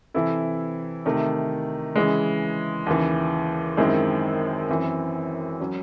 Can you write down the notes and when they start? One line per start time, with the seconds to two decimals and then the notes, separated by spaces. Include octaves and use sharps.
0.14 C3 E3 C4 E4 A4
1.06 C3 D#3 A3
1.96 C#3 E3 G#3
2.86 D#2 C#3 E3
3.77 F#2 D#3 G#3 C4 E4
4.69 F#2 E3 C4
5.60 F#3 C#4